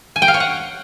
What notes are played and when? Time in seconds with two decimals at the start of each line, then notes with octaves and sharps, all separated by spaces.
0.16 G#5
0.22 G5
0.28 F5
0.34 C#5
0.40 F#5